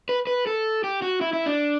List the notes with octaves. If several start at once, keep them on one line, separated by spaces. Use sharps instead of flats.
B4
B4
A4
G4
F#4
E4
E4
D4